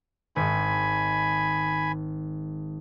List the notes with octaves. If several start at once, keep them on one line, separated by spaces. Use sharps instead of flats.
G#1 G#2 G#5 B5